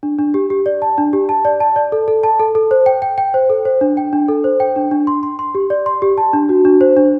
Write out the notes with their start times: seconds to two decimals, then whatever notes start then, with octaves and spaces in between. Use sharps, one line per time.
0.03 D4
0.19 D4
0.34 G4
0.50 G4
0.66 D5
0.82 A5
0.98 D4
1.13 G4
1.29 A5
1.45 D5
1.60 A5
1.76 D5
1.92 A4
2.08 A4
2.23 A5
2.40 A4
2.55 A4
2.71 C5
2.86 G5
3.02 G5
3.18 G5
3.34 C5
3.50 A4
3.65 C5
3.81 D4
3.97 G5
4.13 D4
4.28 A4
4.44 C5
4.60 G5
4.76 D4
4.91 D4
5.07 C6
5.23 C6
5.39 C6
5.55 G4
5.70 D5
5.86 C6
6.02 G4
6.18 A5
6.33 D4
6.49 F#4
6.65 D4
6.81 C5
6.97 D4